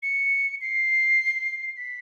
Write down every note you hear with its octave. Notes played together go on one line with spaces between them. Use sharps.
C#7
C7
B6